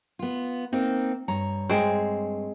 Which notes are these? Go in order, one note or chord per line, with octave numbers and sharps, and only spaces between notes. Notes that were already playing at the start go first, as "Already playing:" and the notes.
B3 F4
A#3 C4 D#4
G2 C#5 A#5
G#3 C4